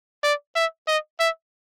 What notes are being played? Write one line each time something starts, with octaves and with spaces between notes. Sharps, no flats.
D5
E5
D#5
E5